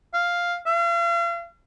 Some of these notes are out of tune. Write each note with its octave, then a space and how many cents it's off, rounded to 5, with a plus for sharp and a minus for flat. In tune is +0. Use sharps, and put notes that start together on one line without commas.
F5 +0
F5 -40